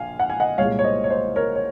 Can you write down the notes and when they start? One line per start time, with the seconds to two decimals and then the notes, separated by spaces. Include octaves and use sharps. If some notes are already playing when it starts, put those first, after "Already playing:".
Already playing: A#1 F5 G#5
0.20 F#5
0.30 G#5
0.40 D#5 F#5
0.58 C2 A#2 G#3 C#5 F5
0.79 C#5
0.84 C5 D#5
1.04 C#5
1.10 C5 D#5
1.36 A#4 C#5
1.56 C#5